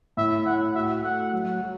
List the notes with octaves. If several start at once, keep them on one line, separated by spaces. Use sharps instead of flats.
A2 E5
A2 F#5
F#4 E5
A3 F#5
F#3
F#3